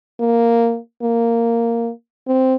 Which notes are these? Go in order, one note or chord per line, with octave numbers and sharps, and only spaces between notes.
A#3
A#3
C4